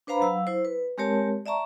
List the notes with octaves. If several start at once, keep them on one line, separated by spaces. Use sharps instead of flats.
D4 B4 C5 F5 A#5 B5
F#3 F5 E6
E4 C5
B4
G#3 C4 G4 A#4 C#5 A5
D5 E5 A5 A#5 C#6